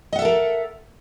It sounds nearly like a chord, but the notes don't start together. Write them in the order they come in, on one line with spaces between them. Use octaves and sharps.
D#5 F#5 E5 A4 A#4